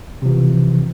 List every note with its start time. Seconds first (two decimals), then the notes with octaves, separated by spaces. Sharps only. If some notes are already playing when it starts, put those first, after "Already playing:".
0.22 C3
0.26 F3
0.29 E3